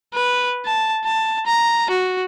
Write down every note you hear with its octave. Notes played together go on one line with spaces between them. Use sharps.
B4
A5
A5
A#5
F#4